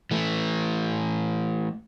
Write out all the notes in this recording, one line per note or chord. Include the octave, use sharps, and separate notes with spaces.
E3 A3